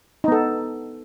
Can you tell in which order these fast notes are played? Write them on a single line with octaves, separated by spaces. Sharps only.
D#4 B3 A4